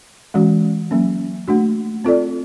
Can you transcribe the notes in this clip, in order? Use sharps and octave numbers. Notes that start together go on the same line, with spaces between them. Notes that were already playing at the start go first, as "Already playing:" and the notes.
E3 G#3 C#4 F#4
F#3 A#3 C#4
A3 D4 F#4
C4 F4 A4 D5